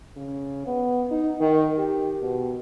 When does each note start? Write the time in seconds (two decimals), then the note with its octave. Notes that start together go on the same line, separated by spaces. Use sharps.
0.17 C#3
0.67 B3
1.11 D#4
1.41 D#3
1.78 G4
2.22 B2